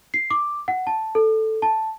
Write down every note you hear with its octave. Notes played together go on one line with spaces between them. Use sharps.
C7
D6
F#5
A5
A4
A5